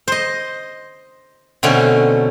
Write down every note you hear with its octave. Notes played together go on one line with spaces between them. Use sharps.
C5 D#5
B2 D3 A3 C4 C#4